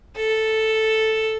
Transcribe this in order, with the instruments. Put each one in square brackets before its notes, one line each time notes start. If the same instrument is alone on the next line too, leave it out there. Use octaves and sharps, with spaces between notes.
[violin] A4